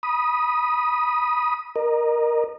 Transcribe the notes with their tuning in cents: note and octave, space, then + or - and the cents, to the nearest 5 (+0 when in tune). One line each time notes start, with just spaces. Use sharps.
B5 -30 D#6 +0
A#4 +10 D#5 -30